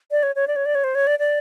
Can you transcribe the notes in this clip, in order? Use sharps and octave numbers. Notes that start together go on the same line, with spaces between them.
D5
C#5
C#5
D5
C#5
D5
C#5
C5
C#5
D5
D5